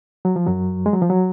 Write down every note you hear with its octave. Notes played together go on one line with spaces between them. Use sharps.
F#3
F3
F#2 F#3
G#3
F#3
F3
F#3